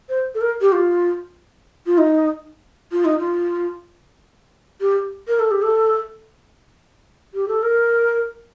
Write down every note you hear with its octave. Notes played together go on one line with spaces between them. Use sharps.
C5
A4
A#4
G4
F4
F4
D#4
F4
D#4
F4
G4
A#4
A4
G4
A4
G4
A4
A#4